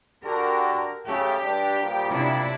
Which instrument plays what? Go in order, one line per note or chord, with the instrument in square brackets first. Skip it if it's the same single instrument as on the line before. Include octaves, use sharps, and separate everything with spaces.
[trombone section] D3 F#4 G4 [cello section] A#4
[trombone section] C#3 A3 [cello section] G4
[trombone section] G2 D4
A#2 F3 G3
[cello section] C3 D4 E4